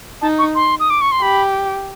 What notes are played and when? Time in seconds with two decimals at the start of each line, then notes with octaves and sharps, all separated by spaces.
0.22 D#4 A5
0.39 C#6
0.55 C6
0.80 D#6
0.90 D6
1.01 C#6
1.12 C6
1.22 G4 B5